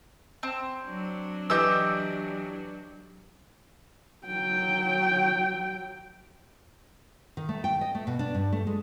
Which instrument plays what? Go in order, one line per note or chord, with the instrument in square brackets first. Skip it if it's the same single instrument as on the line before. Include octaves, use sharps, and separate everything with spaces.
[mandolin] C4
[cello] F#3 D4
[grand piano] E3 D#5 G6 [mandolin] G4 E6
[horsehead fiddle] F#3 G5
[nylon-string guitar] D#3
A3
G5
D#5
A3
B2
D4
G2
A3
G#3